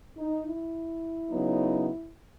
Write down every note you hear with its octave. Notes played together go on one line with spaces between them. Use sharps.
D#4
E4
C#3 F#3 B3 D#4